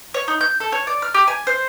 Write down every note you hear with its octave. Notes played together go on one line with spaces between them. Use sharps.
C#5
D#4
G6
A4
C#5
D5
F6
G4
G#5
C5